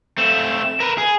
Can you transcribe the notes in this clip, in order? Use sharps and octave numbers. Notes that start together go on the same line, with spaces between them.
A3 C4 E7
A#4 B4
G#4